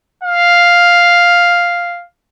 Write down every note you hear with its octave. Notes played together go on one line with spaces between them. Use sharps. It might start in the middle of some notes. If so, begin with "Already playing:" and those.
F5